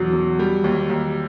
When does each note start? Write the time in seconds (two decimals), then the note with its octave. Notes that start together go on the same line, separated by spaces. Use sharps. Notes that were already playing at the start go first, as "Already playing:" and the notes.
Already playing: E2 B2 F#3
0.13 F#3
0.39 G3
0.64 D#2
0.90 D#2